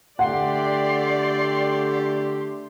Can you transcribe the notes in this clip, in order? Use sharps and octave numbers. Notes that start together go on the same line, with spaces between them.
D3 A3 G4 D5 F#5 C6